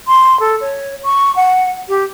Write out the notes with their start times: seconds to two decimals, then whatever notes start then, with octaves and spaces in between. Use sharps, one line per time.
0.07 C6
0.40 A4
0.61 C#5
1.05 C#6
1.36 F#5
1.89 G4